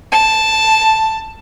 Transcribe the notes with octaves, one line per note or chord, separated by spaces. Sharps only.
A5